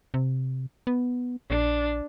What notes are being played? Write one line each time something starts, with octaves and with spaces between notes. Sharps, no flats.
C3
B3
A#1 D4